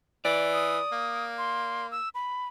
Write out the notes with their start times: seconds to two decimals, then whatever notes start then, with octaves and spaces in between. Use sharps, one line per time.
0.25 E3 D5
0.53 D#6
0.92 A#3
1.38 C6
1.91 E6
2.15 B5